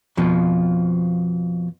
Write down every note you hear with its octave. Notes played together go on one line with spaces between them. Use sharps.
F2 B2 F3